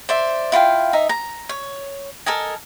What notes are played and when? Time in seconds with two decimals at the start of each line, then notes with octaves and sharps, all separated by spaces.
0.09 C5 D5 E5
0.52 E4 F4 F5 G5
0.93 D#4 E5 A#5
1.09 A#5
1.49 C#5
2.26 A4 A#4 D#5 G#5